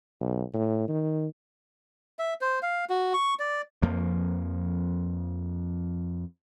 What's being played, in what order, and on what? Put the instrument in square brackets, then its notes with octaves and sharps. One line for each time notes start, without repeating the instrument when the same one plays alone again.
[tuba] B1
A2
D#3
[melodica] E5
C5
F5
F#4
C#6
D5
[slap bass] F2 F3 A#3